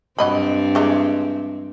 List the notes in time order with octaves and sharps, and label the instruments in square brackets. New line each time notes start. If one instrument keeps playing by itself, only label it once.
[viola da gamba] G2 C4 [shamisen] F#3 D#5 B5
[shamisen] E3 G#3 D#4